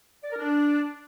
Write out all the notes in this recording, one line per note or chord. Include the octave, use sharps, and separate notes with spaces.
D5
A#4
D4